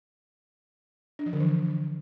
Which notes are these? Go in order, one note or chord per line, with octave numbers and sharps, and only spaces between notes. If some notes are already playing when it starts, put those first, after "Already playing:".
D4
F3
D3
E3